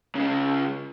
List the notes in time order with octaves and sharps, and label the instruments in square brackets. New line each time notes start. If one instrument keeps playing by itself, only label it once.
[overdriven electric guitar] C#3 G#3